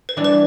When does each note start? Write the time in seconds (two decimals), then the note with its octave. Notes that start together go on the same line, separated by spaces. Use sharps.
0.09 B4
0.17 E3 G3 D4
0.24 B4